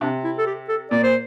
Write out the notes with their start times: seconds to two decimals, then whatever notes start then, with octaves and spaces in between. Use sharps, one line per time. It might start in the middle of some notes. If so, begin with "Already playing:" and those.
0.01 C3 D4
0.24 E4
0.38 A4
0.46 G4
0.69 A4
0.91 A#2 D5
1.03 C5